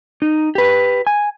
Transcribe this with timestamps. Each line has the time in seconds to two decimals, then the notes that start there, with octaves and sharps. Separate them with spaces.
0.22 D#4
0.55 G4 B4
1.07 G#5